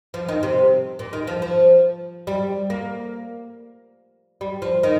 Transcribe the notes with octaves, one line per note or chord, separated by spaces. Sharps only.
F3
D#3
C3
A#2
D#3
F3
F3
G3
A#3
G3
F3
D#3